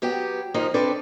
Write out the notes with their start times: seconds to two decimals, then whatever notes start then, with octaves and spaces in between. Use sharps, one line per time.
0.02 F#3 B3 G4
0.54 D#2 F3 A#3 D#4 D#5
0.74 C4 D4 A4 B4 D5